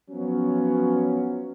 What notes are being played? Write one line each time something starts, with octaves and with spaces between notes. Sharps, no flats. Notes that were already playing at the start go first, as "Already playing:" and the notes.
F3 F#3 B3 C#4